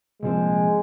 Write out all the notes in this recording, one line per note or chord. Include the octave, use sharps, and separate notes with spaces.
C2 A#2 F3 G#3 C4